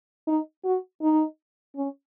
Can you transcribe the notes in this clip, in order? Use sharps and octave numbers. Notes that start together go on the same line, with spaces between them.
D#4
F#4
D#4
C#4